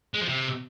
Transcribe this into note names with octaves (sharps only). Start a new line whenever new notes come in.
G#3
F3
C3